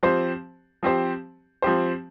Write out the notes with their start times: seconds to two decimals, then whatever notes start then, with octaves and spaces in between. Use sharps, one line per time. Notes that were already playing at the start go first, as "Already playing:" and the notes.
0.03 F3 C4 G4 C5
0.83 F3 C4 G4 C5
1.62 F3 C4 G4 C5